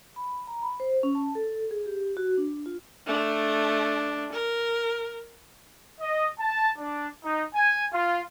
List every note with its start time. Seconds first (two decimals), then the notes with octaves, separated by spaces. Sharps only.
0.16 B5
0.47 A#5
0.62 B5
0.80 C5
1.03 C#4
1.15 A5
1.35 A4
1.71 G#4
1.86 G4
2.17 F#4
2.37 D4
2.66 F4
3.07 A3 D4
4.33 A#4
6.00 D#5
6.39 A5
6.77 D4
7.24 D#4
7.54 G#5
7.92 F4